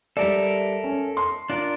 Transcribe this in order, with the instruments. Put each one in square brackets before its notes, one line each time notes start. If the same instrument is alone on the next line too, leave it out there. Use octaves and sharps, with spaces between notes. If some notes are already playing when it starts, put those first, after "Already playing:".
[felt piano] G3 D5 [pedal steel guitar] A4 A#4 E5
[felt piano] C#4
C6
[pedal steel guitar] D4 F4 A#4